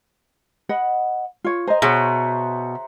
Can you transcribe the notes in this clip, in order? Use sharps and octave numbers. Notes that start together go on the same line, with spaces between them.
D#5 F#5 B5
F4 C#5
C5 D#5 G#5 A#5 C6
B2 G#4 C5 C#5 E5 F#5